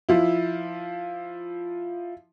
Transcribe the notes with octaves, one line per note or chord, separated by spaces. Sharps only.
F3 E4